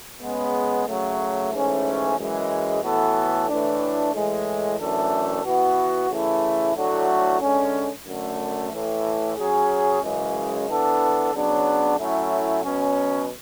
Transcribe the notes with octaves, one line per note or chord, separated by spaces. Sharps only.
C#3 G#3 B3
C#3 F#3 A3
G#2 E3 A3 C#4
F#2 E3 G#3
A2 E3 B3 F#4 A4
A2 E3 A3 D4
A2 E3 G#3
F#2 E3 A3 D4 A4
E3 B3 F#4
C#3 E3 A3 E4 A4
A2 F#3 A3 D4 F#4
D3 G#3 C#4
F#2 D3 A3
A2 E3 A3
F#3 C#4 G#4
F#2 C#3 E3 G#3
E3 B3 D4 A4
C#3 F#3 B3 D4
A2 F#3 A3 C#4 E4
B2 F#3 C#4